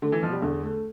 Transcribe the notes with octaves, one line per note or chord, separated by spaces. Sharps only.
D3 A3
E3
B2 F3
G3
E2 D3
A3